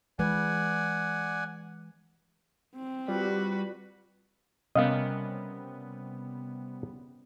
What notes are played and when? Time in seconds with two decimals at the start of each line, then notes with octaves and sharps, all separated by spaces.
0.19 E3 G#3 B4 D5 F#5 G#5
2.75 C4
3.08 G3 F4 F#4 B4 D5
4.75 C3 G3 B3 C#4 A#4 D#5 F5